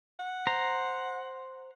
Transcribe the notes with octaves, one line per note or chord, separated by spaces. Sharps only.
F#5
C5 A#5